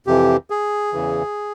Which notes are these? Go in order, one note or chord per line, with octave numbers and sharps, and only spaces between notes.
F2 C3 E3 G4
G#4
E2 C#3 E3